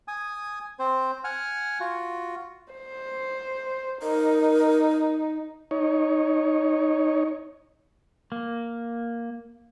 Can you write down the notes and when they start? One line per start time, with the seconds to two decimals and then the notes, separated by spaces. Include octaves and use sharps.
0.08 G#5 D#6
0.79 C4 C5
1.24 F#5 G#5 F6
1.80 F4 F#4
2.73 C5
4.02 D#4 A#4
5.71 D#4 C#5
8.32 A#3